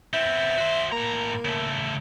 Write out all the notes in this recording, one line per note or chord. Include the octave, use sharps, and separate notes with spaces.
B3 C4 E5
F#4 C5
A2 A#3 A#5
C#3 A3